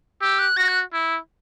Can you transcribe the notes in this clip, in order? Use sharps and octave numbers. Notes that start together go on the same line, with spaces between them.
G4 E6
F#6
F#4 A#6
F#6
E4